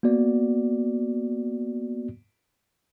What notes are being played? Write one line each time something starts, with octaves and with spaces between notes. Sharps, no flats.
A#3 B3 F#4 D5